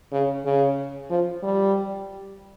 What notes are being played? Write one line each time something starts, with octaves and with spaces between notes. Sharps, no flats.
C#3
C#3
F3
G3